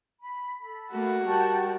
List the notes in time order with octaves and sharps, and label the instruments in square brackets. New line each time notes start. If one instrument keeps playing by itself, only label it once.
[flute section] B5
A4 B5
[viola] A3 A#3 [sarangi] F#4
[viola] G3 A#4 [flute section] G5 A5 C#6